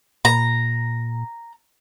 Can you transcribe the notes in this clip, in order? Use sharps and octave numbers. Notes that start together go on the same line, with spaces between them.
A#2 A#5